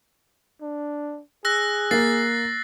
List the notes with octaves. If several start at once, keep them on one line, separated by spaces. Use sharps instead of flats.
D4
G#4 E6 F#6 A#6
A#3 A6 C7